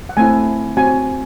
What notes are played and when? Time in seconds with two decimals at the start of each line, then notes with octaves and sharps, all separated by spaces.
0.09 F#5
0.17 A3 C4 E4 G#5
0.77 C4 F#4 G#5